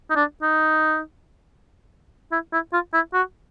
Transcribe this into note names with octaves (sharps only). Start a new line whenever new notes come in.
D#4
D4
D#4
E4
E4
F4
E4
F#4